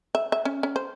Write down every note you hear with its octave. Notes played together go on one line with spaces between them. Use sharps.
E5
E5
C#4
C#4
C5